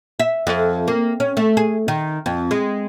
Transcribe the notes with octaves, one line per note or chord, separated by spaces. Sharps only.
E5
F2
A#3
C#4
A3
G#4
D#3
F2
G#3